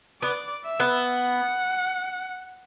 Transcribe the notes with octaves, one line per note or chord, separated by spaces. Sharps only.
B3 D5
E5
B3
F#5